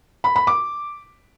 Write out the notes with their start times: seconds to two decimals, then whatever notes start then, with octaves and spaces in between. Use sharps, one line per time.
0.24 B5
0.36 B5
0.47 D6